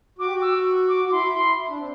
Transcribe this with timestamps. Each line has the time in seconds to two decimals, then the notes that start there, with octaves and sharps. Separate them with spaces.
0.18 F#4 D6
0.26 G4
0.33 F#4
0.42 E6
0.88 D6
1.04 F#4
1.12 E4 C6
1.35 C6
1.58 E4
1.68 D4
1.78 C4